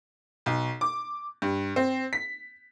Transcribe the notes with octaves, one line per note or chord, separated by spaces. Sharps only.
B1
D6
G2
C4
B6